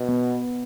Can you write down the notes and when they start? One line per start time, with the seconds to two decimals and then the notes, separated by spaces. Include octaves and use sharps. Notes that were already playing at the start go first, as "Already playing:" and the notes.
Already playing: B2
0.09 B3